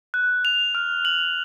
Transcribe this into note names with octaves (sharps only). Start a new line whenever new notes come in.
F#6
F7
F6
F#7